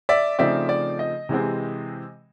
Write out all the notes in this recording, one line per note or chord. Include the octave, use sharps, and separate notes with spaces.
D5 E5
C#3 F3 A3 C4 D#4 D5 E5
D5
D#5
C3 E3 G#3 C4